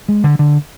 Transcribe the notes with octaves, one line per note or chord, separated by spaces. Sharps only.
G#3
D3
D3